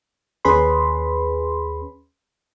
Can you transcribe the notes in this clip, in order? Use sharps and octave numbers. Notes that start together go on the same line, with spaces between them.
D#2 C#4 G#4 B4 B5 C6